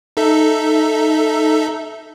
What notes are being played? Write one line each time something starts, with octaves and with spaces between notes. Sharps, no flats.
D#4 A4 E5